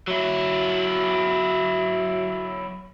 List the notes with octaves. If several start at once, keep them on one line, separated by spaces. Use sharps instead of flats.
F#3 E4